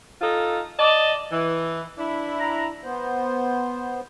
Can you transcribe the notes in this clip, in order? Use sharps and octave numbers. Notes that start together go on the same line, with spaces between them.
D#4 F4 A4
D5 D#5 A5
E3
D4 E4
A#5
B3 C5